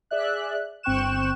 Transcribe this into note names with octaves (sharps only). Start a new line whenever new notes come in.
G#4 D5 E5 F#6
G1 C4 G5 C#6 F#6 E7